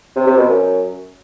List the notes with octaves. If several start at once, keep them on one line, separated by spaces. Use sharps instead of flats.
C3
C3
B2
F#2